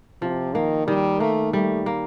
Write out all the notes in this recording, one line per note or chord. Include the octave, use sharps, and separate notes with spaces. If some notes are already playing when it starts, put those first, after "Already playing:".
C3 F3
D#3 A#3
D#3 G3
A3 A#3
G3 A3
A#3